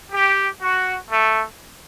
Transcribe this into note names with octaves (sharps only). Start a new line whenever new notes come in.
G4
F#4
A3